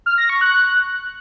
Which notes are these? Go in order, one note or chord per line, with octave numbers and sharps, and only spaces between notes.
F6
A#6
C#6
F#6